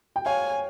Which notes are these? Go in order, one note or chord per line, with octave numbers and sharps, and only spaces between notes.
G5
C#5 F5 G#5